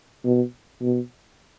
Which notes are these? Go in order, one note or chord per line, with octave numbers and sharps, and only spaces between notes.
B2
B2